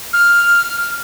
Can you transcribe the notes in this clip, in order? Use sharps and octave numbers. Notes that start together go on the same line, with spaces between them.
F6